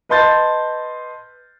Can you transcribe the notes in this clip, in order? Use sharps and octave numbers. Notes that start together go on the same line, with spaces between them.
B4 D#5 A5 C6 G6 A6